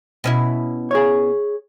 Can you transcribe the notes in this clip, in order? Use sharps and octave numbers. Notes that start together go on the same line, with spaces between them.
B2 C#4 E4
G#4 C#5